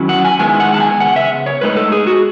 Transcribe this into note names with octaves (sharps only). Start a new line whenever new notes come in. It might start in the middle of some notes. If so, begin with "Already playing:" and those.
Already playing: D#3 F#3 C#4 E4
F#5
G#5
D#3 G#3 B3 E4 G#5
F#5
A5
G#5
C#3 G#3 B3 F#5
E5
C#5
A2 G#3 B3 D#4 B4
A4
G#4
F#4